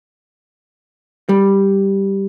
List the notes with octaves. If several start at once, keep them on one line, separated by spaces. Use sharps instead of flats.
G3